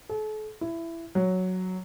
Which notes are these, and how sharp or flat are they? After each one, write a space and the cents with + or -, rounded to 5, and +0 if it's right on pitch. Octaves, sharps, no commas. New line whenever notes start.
A4 -40
E4 +15
F#3 +0